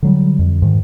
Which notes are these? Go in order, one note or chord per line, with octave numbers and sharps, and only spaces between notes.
D3 F#3 G3
F2
G#2 D#3